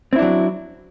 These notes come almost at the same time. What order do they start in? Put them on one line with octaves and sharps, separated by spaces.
C4 E4 D4 F#3